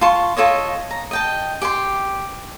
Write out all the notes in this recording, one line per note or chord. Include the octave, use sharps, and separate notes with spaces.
F4 A5 C6 C#6
F4 A4 C#5 D#5
A#5
D#5 G5 A5
G4 G5 G#5 C6